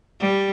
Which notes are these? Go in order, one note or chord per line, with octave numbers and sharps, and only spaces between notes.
G3